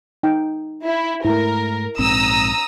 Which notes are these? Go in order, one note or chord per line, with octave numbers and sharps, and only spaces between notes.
D#4 G5
E4
G#2 A3 E4 A#4
A#1 G#2 C4 A#5 D#6 E6